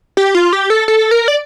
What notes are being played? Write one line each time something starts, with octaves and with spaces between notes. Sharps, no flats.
G4
F4
G4
A4
A4
A#4
D5